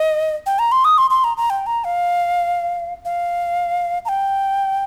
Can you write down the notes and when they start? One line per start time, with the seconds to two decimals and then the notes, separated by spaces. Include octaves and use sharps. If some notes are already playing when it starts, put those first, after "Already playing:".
Already playing: D#5
0.46 G5
0.59 A#5
0.72 C6
0.85 D#6
0.98 C6
1.10 C6
1.24 A#5
1.37 A#5
1.50 G5
1.67 A#5
1.84 F5
3.05 F5
4.05 A#5
4.09 G5